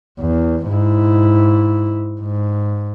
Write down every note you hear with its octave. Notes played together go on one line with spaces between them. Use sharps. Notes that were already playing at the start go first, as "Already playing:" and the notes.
E2
G#2 E4
G#2